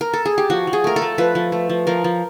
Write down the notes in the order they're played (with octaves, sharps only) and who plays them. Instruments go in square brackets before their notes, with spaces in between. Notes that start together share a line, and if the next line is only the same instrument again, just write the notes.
[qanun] A#4
A4
G#4
G4
F3 F#4
F3
G#4
A3 A#4
A4
A3
F3 B4
F3
A3
F3
F3 A#4
F3